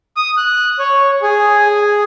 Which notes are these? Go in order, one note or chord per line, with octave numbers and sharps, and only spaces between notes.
D#6
F#6
C#5
G#4